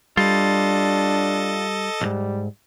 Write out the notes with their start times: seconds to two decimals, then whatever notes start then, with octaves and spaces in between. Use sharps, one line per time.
0.17 G3 D4 F4 A4 D#5 A6
2.01 B1 G#2 G3